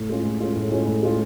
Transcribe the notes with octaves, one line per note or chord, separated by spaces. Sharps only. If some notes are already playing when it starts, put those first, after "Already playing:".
Already playing: A2
G#3 C#4 F4
A2
G#3 C#4 F4
A2
G#3 C#4 F4
A2
G#3 C#4 F4